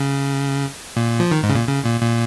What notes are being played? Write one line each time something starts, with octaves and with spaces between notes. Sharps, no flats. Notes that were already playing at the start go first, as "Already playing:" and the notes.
Already playing: C#3
A#2
F3
D#3
G#2
C#3
A#2
C#3
A#2
A#2